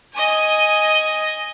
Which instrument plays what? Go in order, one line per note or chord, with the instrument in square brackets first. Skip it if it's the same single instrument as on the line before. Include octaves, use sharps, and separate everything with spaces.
[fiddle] D#5 G#5